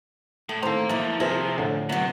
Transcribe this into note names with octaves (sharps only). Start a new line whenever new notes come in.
A2 A4
A2 D#3 C4 A4 C5 F5 A#5
E3 F3 A#3 D#4 E4
C3 F3 G#4 E5
A2 D3
C3 F#3 B3